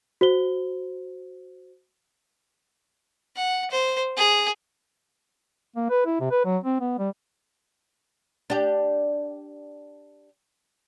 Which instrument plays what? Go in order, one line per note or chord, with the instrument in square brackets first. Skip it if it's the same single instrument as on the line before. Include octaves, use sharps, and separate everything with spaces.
[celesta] F#4 C5 G7
[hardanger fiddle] F#5
C5
G#4
[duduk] A#3
B4
E4
C3
B4
F#3
C4
B3
G3
[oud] D4 G4